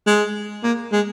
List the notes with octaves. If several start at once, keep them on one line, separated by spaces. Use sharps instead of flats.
G#3
A#3
G#3